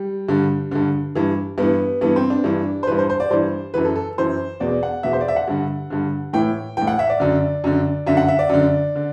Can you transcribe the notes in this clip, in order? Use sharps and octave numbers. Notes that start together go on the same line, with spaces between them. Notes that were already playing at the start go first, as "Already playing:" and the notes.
Already playing: G3
G2 D3
G2 D3
G2 E3
G2 E3 B3
G2 E3 B3
C4
D4
G2 E3
C5
G2 E3 B4
C5
C5
D5
G2 E3 C5
F#2 E3 B4
A4
A4
F#2 E3 C5
E2 B2 D5
F#5
E2 B2 E5
C5
D5
E5
F#5
G2 D3
G2 D3
A2 E3 G5
A2 E3 G5
F#5
E5
D5
F#2 D3
F#2 D3
F#2 D3 E5
F#5
E5
D5
F#2 D3
D3